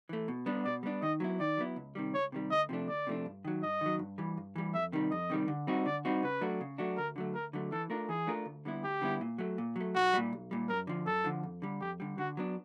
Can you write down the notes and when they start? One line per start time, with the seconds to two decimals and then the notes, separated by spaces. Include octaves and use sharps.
0.09 E3 A3
0.28 B2
0.46 G3 B3 D4
0.64 B2 D5
0.83 G3 B3 D4
1.02 D#3 D#5
1.20 F#3 B3 E4
1.40 D#3 D5
1.57 F#3 B3 E4
1.76 C#2
1.95 C3 D#3 G3
2.14 C#2 C#5
2.32 C3 D#3 G3
2.51 D2 D#5
2.69 C3 F3 A3 D4
2.88 D2 D5
3.07 C3 F3 A3 D4
3.26 G2
3.45 D#3 F#3
3.62 G2 D#5
3.81 D#3 F#3
3.99 G2
4.18 E3 G3
4.37 G2
4.56 E3 G3
4.74 F2 E5
4.92 C3 D#3 G3
5.11 F2 D#5
5.30 C3 D#3 G3
5.48 D3
5.67 G3 C4 D#4 F#4
5.85 D3 D5
6.05 G3 C4 D#4 F#4
6.23 C#3 B4
6.41 F#3 A3 D4 F#4
6.61 C#3
6.78 F#3 A3 D4 F#4
6.97 D2 A#4
7.16 D3 F#3 A3
7.34 D2 A#4
7.53 D3 F#3 A3
7.72 E3 A4
7.90 A3 D4 F4 A#4
8.09 E3 G#4
8.27 A3 D4 F4 A#4
8.46 D2
8.65 D3 G3 B3 E4
8.83 D2 G4
9.01 D3 G3 B3 E4
9.21 A#2
9.38 F#3 A3
9.58 A#2
9.76 F#3 A3
9.95 B1 F#4
10.13 A#2 G3
10.33 B1
10.51 A#2 G3
10.69 F#2 A#4
10.87 D3 F3
11.06 F#2 A4
11.24 D3 F3
11.43 F2
11.62 D3 G3
11.80 F2 G4
12.00 D3 G3
12.18 D3 F#4
12.37 F#3 B3 D4